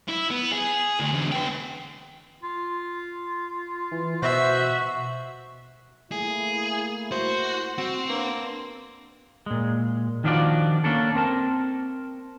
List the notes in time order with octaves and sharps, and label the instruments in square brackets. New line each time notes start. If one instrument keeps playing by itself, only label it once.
[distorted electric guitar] E4
B3
G#4
D2
E2 D3
B3 G5
[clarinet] F4
[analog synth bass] E3
[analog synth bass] B2 [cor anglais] F#4 [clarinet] C5 [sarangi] E5
[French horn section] A3 A#3 E4 [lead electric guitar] G#4
[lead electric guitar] F#4 [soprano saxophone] C5
[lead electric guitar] C4 [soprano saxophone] F#4
[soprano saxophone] A#3 [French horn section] D4 B4
[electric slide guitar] A#2 G#3
D#3 F3 D4 F4 F#4 D5
A#3 C#4 D4 A4
C4 A#4 A5